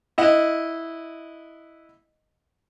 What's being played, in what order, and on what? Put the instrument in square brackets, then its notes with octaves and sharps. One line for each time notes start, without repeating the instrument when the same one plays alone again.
[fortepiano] E4 D#5 F#5